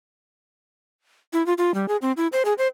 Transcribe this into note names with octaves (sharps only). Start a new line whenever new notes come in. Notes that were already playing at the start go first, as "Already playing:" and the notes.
E4
F4
F4
G3
G#4
C4
E4
C5
G#4
C5